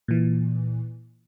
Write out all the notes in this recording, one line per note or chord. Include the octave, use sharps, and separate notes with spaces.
A#2 E3